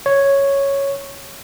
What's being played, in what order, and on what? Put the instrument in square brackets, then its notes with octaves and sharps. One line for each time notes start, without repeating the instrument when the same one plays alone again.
[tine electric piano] C#5